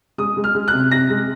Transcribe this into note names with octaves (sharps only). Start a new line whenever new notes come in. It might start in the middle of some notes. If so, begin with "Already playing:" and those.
G#3 D#6
G#3
F6
G#3
F#6
C3
C3 A#6
G#3